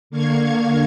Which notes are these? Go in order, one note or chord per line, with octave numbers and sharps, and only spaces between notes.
D3 A#3 F5 C#6 G#6